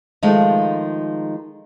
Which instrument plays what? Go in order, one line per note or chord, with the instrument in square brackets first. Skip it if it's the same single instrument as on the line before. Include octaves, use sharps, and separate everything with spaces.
[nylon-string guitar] D#3 F3 G#3 A3 D#4 F4